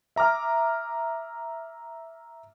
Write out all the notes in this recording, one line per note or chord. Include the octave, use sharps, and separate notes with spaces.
E5 A#5 D6 F6